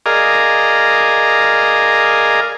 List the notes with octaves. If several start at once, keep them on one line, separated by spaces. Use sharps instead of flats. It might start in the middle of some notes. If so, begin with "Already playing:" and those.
G#4 A#4 D5 D#5 F5